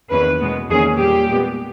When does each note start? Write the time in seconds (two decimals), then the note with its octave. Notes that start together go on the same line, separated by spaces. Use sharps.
0.11 E2 D#3 A#3 C#4 B4
0.40 B2 G#3 B3
0.70 E2 D#3 A#3 C#4 G#4
0.99 A#2 G3 A#3 G4
1.29 A#2 G#3 B3